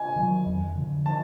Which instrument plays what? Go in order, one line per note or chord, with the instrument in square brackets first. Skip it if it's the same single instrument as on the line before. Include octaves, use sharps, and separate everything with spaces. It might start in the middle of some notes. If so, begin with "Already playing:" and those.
Already playing: [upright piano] G#5
[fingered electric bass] D#3 F#3
F2
D3 F3
[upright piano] A5